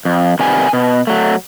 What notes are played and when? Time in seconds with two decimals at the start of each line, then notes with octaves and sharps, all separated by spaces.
0.05 F2
0.39 C3 D#3 G3 B3 G#5
0.73 B2
1.07 F#3 A3